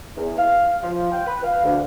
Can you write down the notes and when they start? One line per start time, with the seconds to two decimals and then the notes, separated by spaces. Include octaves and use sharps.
0.17 E2
0.39 F5
0.83 F3
1.12 G5
1.26 B4
1.45 F5
1.65 D2